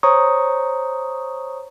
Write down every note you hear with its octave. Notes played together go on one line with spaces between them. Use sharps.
C5 C#5 A#5 C#6 D#6